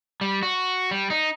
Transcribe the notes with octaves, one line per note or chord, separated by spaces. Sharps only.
G3
F#4
G3
D#4